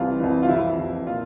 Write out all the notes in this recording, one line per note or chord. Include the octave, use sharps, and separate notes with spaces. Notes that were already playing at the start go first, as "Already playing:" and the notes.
Already playing: C2 C3 E3 F4
C2 C3 E3
F4
F2 C3 E3 E4
F2 C3 E3
A#2 F4